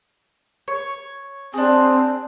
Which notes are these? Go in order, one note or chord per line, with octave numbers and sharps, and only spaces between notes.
C#5
C4 D4 G#4